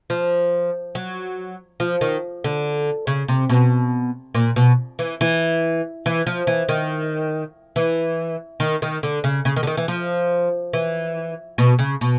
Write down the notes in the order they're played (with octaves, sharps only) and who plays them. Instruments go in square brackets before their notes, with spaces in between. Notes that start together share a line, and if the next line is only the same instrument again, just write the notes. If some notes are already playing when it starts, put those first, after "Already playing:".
[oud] F3
F#3
F3
D#3
D3
C#3
C3
B2
A#2
B2
E3
E3
E3
F3
E3
D#3
E3
D#3
D#3
D3
C#3
C#3
D#3
D3
D#3
E3
F3
E3
B2
C#3
B2